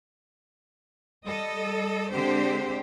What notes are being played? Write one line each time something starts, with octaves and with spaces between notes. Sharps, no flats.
G3 A4 D#5
D3 G#3 C4 D4 G4 C5